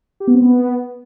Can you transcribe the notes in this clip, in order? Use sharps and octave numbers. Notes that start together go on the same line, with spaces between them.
G4
B3
C4
B3